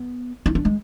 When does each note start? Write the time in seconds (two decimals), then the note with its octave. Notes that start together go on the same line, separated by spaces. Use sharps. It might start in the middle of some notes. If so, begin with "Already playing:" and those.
Already playing: B3
0.46 D#4
0.55 D4
0.65 G#3